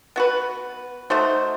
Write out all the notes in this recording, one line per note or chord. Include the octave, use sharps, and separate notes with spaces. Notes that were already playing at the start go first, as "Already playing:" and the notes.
B3 F#4 B4
A3 D#4 F#4 C5